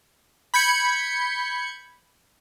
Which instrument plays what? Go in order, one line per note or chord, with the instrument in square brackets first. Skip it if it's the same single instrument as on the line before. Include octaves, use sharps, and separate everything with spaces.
[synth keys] B5 G6 G#6 C#7